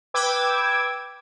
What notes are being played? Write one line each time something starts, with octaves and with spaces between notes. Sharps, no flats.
B4 G5 D6 E6 G#6